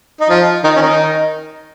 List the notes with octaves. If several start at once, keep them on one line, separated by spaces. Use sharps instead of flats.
D#4
F3 F4
D#3 D#4
C#4
D#3 D#4